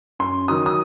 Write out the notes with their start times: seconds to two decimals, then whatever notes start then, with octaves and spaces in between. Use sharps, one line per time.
0.19 F#2 C6
0.48 D#3 F#3 D#6
0.66 D#6